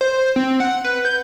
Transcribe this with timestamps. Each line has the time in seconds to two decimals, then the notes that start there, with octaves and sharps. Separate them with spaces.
0.01 C5
0.36 C4
0.60 F#5
0.84 B4
1.05 G6